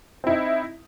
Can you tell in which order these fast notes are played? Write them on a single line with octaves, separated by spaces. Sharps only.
C4 E4 D#4